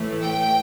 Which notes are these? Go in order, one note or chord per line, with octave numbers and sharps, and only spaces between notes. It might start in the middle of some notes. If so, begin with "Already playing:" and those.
Already playing: A2 E3 A3
G5